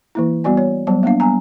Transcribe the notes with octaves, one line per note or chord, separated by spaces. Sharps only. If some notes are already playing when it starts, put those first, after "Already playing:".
E3 A#3 E4
G3 B3 F#4 D5 G#5
C#5
F#3 G3 B3 A5
A#3 B3 D4 F5
G3 B3 G#5 A#5